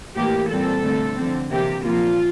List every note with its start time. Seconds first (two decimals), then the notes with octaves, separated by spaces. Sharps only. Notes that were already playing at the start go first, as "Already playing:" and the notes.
0.15 A2 E3 A#3 G4
0.50 A#2 G3 C4 A4
0.83 D3 A3 C4
1.16 D3 F3 C4
1.50 C3 E3 A#3 G4
1.84 A#2 F3 A#3 F4